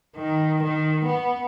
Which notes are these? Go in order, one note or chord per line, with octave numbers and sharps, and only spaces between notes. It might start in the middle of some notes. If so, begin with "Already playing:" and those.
D#3
D#3
B3